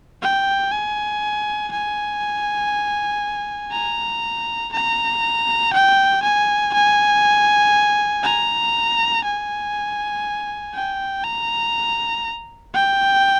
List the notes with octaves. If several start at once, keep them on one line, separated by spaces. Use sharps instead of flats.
G5
G#5
G#5
A#5
A#5
G5
G#5
G#5
A#5
G#5
G5
A#5
G5